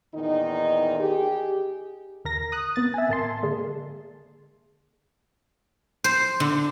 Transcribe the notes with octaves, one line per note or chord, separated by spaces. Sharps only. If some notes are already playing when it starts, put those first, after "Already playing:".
E2 A#2 D#3 D#4
G4 G#4
D#2 A#4 A#6
D#6 F#6
C3 B3 A6
E5 G#5
A1 A#4 A5 C6
D3 G#3 A#3
C5
D3